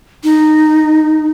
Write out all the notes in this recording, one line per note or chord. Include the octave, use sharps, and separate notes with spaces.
D#4